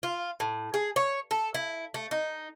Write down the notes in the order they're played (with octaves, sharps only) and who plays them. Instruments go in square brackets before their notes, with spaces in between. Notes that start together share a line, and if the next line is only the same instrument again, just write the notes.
[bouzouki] F4
A2
G#4
C#5
A4
E4
A3
D#4